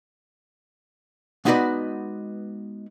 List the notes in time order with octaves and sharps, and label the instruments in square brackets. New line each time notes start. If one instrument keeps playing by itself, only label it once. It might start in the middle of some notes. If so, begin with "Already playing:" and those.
[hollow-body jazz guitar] G#3 B3 D#4 F#4 B4 D5